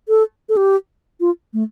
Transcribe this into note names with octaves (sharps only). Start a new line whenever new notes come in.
A4
A4
G4
F4
A3